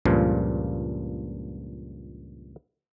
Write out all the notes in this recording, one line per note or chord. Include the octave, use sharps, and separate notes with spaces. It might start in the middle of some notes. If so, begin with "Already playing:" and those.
C#2 G2 A#2 F3